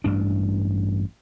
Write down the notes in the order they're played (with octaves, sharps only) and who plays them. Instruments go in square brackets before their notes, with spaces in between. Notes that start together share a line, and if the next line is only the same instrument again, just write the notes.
[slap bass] A1 G2 D4